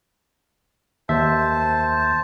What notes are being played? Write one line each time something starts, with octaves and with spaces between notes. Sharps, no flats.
D#2 C5 E5 A5